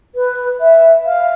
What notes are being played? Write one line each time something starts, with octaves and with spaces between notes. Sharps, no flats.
B4
E5
F5